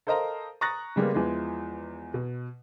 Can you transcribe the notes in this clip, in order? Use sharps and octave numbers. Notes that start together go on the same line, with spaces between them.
A4 A#4 C5 D#5 F5 A#5
A#5 C#6 D#6 F#6 A6 A#6
C#3 G3 G#3 A#3 B3
E2 E3 F3 G#3 B3
B2